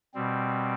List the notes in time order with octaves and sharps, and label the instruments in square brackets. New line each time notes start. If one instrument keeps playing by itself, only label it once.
[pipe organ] B2 G3 C4